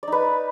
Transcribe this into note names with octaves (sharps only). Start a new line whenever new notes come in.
D#4 B4 D5